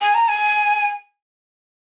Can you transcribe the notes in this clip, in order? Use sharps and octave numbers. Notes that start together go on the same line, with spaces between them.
G#5
A#5
G#5